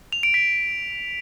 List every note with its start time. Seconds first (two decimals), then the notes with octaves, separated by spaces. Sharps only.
0.13 F7
0.23 D7
0.34 B6